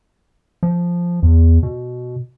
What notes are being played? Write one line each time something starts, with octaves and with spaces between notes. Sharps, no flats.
F3
E2
B2